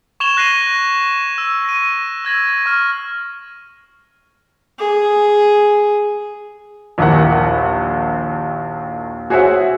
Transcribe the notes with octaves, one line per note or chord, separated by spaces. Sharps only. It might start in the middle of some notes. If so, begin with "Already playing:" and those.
C#6 G#6 E7 F7 G7
F#6 A#6 C7 D#7 F7 F#7
E6
A#6 D#7
E6 G#6 A#6 F#7
C#6 F6
G#4
A#1 D#2 D#3 A#3 E4 F#5
F#4 G#4 C5 C#5 E5 F#5